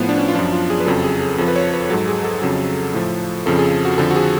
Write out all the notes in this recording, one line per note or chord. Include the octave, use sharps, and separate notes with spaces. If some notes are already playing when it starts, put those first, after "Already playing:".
Already playing: A2 F3 B3
D4
C#4
F4
F#2 F3 D4
F4
G#4
B4
F2 C#3 F#3 A4
G#4
G#4
F2 F3 A4
B4
C#5
B4
G#2 F#3 A4
G#4
A4
F2 C#3 F#3
A2 F3
F2 C#3 F3 A4
G#4
F#4
F2 D3 F3 A4
F#4
G#4